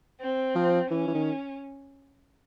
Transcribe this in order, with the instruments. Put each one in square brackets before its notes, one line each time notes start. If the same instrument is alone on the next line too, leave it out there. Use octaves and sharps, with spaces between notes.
[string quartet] C4
[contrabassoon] F3
[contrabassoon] E3 [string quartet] C#4
[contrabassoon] E3
D#3